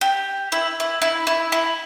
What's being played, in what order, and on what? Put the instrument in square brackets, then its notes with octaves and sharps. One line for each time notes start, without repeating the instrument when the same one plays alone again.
[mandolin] G4
E4
E4
E4
E4
E4